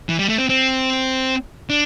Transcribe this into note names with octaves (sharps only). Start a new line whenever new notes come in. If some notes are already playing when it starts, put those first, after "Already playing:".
E3
G3
A3
C4
C4
D4